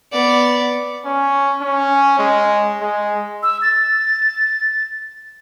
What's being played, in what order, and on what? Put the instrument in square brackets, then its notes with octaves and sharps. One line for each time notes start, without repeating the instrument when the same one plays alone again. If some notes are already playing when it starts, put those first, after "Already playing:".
[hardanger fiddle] B3 D5
[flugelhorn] C#4
C#4
G#3
G#3
[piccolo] E6
A6